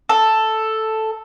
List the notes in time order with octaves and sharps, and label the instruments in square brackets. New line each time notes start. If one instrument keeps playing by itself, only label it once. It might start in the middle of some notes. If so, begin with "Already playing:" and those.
[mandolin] A4